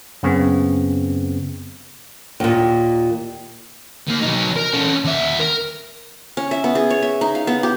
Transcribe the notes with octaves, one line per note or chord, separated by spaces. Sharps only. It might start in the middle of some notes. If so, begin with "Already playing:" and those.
F#2 C#3 B3 C4
D#2 A#2
D#3 A#3
F#3 D#4
A#4
C#4 A4
D#2 E5
A#4
C#4
E5
B3
G#4
C#5
E5
D#4
F5
B3
G4